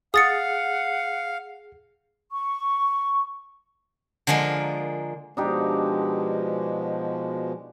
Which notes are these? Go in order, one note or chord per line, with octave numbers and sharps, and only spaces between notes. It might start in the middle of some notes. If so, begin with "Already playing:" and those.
G#4 F5 F#5 D#6 A6 C#7
C#6
D3 F3 G#3 A#3 A#4
B2 F3 G#3 D4 D#4 G4